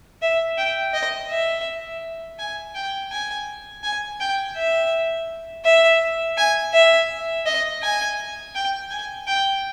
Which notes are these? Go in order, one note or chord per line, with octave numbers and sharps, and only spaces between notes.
E5
G5
D#5
E5
G#5
G5
G#5
G#5
G5
E5
E5
G#5
E5
D#5
G#5
G5
G#5
G5